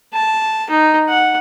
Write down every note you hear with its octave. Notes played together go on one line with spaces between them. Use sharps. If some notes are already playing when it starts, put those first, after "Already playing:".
A5
D#4
F#5